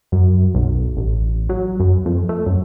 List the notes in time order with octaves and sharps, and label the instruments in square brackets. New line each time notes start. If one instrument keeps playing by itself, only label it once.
[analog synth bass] F#2
B1
A1
F#3
F#2
F2
A3
F#2